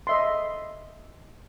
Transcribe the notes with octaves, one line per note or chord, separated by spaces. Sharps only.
D#5 E5 C6